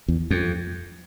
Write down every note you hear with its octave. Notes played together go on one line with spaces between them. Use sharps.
E2
F2